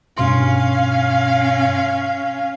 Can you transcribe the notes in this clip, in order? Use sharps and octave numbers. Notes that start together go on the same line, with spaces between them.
G2 B2 C#4 F5 C6